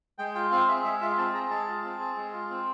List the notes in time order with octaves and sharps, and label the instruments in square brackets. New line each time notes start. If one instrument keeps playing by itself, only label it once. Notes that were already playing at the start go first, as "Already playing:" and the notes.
[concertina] G#3 G5
F4 G5
C4 F5
G#4 E5
G#3 E5
F4 E5
C4 A5
G#4 A#5
G#3 A5
F4
C4
G#4
G#3
F4
C4